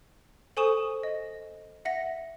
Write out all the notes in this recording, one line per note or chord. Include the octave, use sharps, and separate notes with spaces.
A4 C5 G#5 C#6 D#6 E7
D#5
E5 F#5 A#6